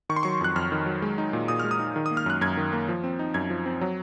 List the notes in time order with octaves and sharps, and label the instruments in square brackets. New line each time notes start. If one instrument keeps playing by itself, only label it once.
[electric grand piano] D#3 C#6
C6
F#3 C#6
F2 F#6
F2 F6
D#3
F#3
G#3
D#4
A#2
A#2 D#6
G#3 F6
D#6
D#4
D#3
D#6
A#3
F6
F#2 F#6
F#2 G#6
D#3
A#3
F3
C4
D#4
F#2 G#6
F3
C4
F#3